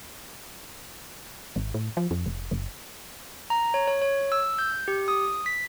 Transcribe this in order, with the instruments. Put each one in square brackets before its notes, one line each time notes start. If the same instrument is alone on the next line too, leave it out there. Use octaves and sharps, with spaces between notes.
[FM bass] G#1
A2
F3
F2
F1
F#1
[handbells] A#5
C#5
C#5
C#5
E6
G6
G4
D#6
B6